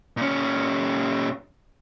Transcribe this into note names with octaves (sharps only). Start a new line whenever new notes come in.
A#2 C#4